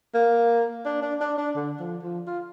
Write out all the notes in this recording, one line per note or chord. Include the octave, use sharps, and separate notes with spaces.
A#3
D4
D4
D4
D4
D3
F3
F3
F4